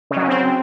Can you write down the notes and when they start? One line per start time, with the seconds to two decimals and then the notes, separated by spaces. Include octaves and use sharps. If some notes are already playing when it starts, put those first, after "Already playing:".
0.11 C#3
0.16 F#3
0.22 C#4
0.28 C4